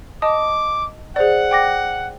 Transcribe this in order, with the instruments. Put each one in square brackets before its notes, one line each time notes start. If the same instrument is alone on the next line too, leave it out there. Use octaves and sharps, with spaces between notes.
[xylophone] D#5 A5 D#6 [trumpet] D6
[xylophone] G#4 C5 D5 [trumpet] F#5
[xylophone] G5 D6 A#6